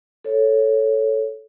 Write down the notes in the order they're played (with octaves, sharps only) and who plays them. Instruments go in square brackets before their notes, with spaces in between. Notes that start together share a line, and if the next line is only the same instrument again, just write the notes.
[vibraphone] A4 C#5